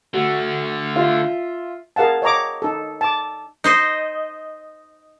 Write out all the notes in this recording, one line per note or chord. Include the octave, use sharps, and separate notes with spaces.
D3 A3 F#4
F4 E5
G#4 A#4 F5 F#5 A5
C#5 D#5 A#5 D6
D#4 A4
A5 D6
D#4 C5 D#5